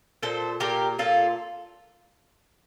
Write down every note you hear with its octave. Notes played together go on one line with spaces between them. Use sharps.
A#2 A4 C5
A#2 G4 A#4
A#2 F4 A4